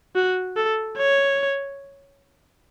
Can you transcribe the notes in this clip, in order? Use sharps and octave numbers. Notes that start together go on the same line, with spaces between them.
F#4
A4
C#5